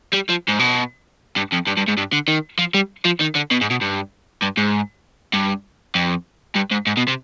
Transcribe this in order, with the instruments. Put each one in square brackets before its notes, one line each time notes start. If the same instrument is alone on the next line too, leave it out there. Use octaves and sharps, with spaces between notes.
[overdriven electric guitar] G3
F3
G#2
B2
G2
F2
G2
G2
G#2
G2
D3
D#3
F3
G3
F3
D#3
D3
B2
G#2
B2
G2
G2
G#2
G2
F2
G2
G#2
G#2
B2
C3